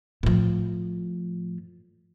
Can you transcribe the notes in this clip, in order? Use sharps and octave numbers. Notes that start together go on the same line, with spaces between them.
A2 F3